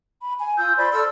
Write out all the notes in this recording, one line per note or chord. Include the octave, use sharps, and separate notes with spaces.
B5
G#5
F4 D#6 E6 G6
C5 D5 B5 C6
A4 D5 E6 F6